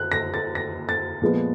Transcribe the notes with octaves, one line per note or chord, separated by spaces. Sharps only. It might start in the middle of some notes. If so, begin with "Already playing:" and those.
Already playing: F#6
A#6
A6
A#6
A6
A#2 F3 G#3 B3